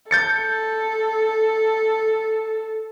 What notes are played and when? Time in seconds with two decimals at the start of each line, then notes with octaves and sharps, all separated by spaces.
0.11 A4 G6 A6 C#7